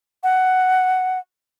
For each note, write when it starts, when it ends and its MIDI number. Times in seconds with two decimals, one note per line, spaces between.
0.23 1.19 78